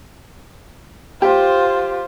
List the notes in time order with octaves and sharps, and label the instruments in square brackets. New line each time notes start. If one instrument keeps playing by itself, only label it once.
[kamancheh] F4 C5 [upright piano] G4